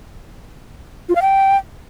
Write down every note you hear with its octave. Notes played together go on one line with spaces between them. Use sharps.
F4
F5
G5